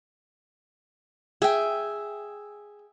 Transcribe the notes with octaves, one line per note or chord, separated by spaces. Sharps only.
G#4 E5 G5